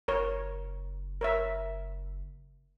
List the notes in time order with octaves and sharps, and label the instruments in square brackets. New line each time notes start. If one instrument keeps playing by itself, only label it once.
[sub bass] F#1 [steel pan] A#4 C#5
[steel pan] A#4 C#5 E5